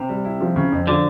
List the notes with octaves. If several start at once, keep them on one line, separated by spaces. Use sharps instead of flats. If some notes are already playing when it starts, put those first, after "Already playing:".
Already playing: C3 C4
G3
E4
F3
C#3
F2
D3 F3